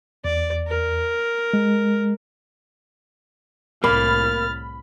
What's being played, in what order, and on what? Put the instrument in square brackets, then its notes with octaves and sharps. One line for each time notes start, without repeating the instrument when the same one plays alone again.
[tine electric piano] E2 [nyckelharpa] D5
[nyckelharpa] A#4
[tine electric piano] G#3
[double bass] C2 A2 [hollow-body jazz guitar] A#3 [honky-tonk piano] B5 [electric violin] F6 A6